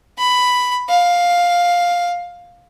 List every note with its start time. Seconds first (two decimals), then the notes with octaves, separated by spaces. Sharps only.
0.18 B5
0.89 F5